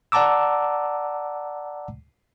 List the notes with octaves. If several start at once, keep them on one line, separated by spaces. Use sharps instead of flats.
D5 F#5 A5 A#5 D6 E6